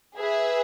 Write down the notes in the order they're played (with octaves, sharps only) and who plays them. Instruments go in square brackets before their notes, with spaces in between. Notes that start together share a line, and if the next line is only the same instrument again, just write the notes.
[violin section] G#4 B4 E5